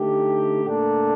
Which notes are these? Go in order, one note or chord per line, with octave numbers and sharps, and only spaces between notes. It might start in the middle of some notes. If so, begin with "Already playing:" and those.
Already playing: D3 A3 D#4 G4
A#2 A3 D4